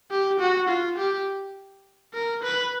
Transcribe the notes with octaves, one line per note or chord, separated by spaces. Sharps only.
G4
F#4
F4
G4
A#4
B4